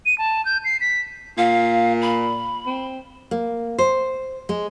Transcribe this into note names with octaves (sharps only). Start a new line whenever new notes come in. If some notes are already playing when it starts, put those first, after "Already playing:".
D#7
A5
G6
C7
B6
A#2 F5
B5
C4
A#3
C5
G#3